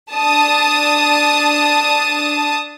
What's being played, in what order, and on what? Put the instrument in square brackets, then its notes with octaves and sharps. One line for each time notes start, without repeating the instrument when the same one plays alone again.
[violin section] D4 A5 D#6